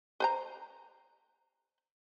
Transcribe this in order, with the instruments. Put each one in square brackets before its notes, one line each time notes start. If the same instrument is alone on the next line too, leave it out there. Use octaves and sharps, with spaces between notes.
[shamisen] B4 C5 A#5